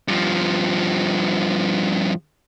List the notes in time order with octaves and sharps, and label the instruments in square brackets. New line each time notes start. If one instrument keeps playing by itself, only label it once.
[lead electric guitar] G2 F3